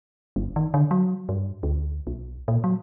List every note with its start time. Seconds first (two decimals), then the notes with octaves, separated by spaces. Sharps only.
0.36 G1
0.56 D#3
0.74 D3
0.91 F#3
1.29 G2
1.63 D2
2.07 B1
2.48 A#2
2.64 F#3